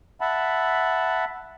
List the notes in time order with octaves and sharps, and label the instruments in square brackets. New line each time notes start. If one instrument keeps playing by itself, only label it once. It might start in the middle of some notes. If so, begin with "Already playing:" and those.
[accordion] E5 F#5 A5 B5